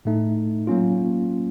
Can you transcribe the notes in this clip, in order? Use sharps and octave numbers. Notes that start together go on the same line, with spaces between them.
A2 A3 D#4
F#3 A#3 C#4 F4